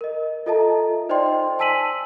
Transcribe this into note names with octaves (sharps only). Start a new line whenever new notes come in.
A#4 D#5
F4 A4 D#5 E5 A5 A#5
D#4 C5 D5 D#5 G5 C6
G#5 A5 E6 B6 D#7 F#7